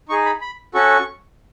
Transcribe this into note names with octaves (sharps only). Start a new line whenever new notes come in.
D#4 G#4 C#6
B5
B5
C#4 F#4 A4 C#6